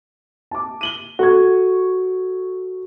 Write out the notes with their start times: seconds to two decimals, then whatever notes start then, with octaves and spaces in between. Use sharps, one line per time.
0.51 A5 D6
0.81 D#7 F#7 G7
1.19 F#4 A4 C#6 G#6